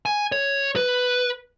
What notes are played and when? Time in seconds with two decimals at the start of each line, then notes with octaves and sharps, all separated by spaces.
0.06 G#5
0.32 C#5
0.76 B4